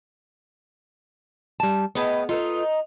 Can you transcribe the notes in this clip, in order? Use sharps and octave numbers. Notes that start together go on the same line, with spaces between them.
G3 A5
A2 B3 G#4 B4 D#5
D#4 F4 A4 B4